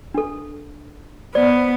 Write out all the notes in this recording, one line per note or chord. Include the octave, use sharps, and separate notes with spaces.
D4 A4
B3 C5 D5